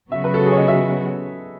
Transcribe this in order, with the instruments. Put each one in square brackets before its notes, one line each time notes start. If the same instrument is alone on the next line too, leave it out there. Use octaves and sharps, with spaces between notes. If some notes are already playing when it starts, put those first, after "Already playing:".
[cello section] C#3 F#3 B3 F#4 [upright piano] E5
[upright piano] B4
A4
G#4
C#5
D#5
E5